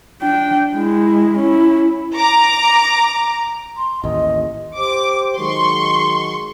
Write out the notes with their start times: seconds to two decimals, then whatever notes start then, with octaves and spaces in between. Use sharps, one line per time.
0.22 D4 G5
0.75 G#3 E4
1.38 C#4 E4
2.16 A#5 D6
3.77 C6
4.04 A1 D#2 D#5
4.77 G4 C5 D6
5.38 D#3 F#3 G#3 C6 C#6